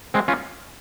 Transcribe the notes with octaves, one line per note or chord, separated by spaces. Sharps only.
G#3 C4
C#4 F4